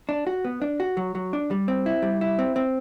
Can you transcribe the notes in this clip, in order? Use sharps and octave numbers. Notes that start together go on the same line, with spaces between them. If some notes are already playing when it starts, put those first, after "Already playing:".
D4
F#4
B3
D4
F#4
F#3
F#3
D4
G3
C4
E4
G3
E4
C4
C4